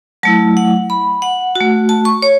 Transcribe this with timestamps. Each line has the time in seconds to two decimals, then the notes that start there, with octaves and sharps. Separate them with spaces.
0.23 F#3 A3 E4 A5
0.57 F#5
0.90 B5
1.22 F#5
1.55 A3 F#4
1.89 A5
2.05 C#6
2.22 C#5